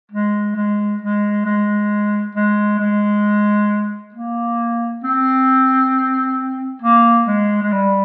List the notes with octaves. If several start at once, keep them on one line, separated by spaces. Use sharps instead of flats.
G#3
G#3
G#3
G#3
G#3
G#3
A#3
C4
A#3
G#3
G#3
G3